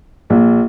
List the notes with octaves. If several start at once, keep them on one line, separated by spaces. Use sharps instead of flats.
A#1